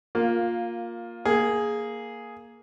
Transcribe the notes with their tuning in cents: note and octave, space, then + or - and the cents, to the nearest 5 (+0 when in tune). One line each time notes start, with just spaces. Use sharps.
A#3 +0 F4 +15
A#3 +0 G#4 +5